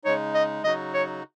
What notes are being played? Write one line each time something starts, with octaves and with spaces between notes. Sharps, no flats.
C#3 G#3 D#4 C#5
D#5
C#3 F#3 D#4 F#4 D#5
C#5